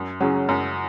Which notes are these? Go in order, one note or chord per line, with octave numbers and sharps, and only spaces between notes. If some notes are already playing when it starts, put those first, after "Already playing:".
Already playing: F#2
C#3 F#3 C#4
F#2